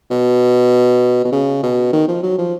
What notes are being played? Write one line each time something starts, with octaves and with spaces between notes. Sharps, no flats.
B2
B2
C#3
B2
D#3
F3
F#3
F3